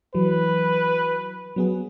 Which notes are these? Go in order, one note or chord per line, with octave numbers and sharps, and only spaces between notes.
E3 F#3 B4
F#3 B3 G#4